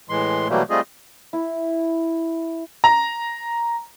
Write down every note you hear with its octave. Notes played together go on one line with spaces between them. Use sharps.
A2 E3 G#3 C6
B2 E3 F#3 G3 A3 A#3
G3 A3 C4 F4 G#4 D#5
E4
A#5